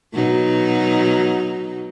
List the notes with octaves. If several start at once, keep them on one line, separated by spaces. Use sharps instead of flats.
B2 F#3 D#4